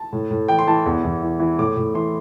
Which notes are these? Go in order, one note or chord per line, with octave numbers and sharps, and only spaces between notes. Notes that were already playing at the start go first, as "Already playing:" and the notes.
Already playing: A5
A2
A2
E3 G5
C6
E3 A5
E2
E2
E3
E3
A2 D6
A2
E3 C6